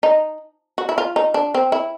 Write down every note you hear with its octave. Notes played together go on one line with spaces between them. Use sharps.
D#4
F#4
E4
F4
D#4
D4
C4
E4